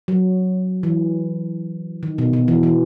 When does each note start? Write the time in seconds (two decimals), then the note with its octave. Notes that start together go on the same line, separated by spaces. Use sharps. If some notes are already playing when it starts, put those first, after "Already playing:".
0.08 F#3
0.83 E3
2.03 D#3
2.18 B2
2.33 B2
2.48 E3
2.63 E3